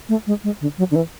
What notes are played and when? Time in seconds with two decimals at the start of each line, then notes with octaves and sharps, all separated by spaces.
0.09 A3
0.27 G#3
0.44 G#3
0.61 D3
0.78 F#3
0.91 D3
0.95 E3